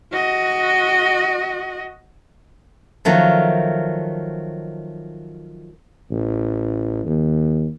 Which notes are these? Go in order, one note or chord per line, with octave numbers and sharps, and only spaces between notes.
F#4 D#5
D#3 F3 F#3 A3
A1
D#2